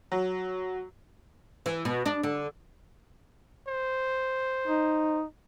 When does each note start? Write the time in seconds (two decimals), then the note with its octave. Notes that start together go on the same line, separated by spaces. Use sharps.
0.12 F#3
1.66 E3
1.85 B2
2.06 D4
2.23 D3
3.68 C5
4.67 D#4